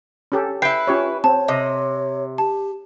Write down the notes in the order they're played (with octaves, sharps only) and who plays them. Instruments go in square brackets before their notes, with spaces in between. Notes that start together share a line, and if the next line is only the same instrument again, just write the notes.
[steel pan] C#4 G4 A4
[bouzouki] E4 B4 [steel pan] G5 [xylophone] C7
[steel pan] C#4 G4 C#5 [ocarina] F4
[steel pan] C4 [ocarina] C#5 [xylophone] A5
[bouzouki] C3 [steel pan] D#5
[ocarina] G4 [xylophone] A5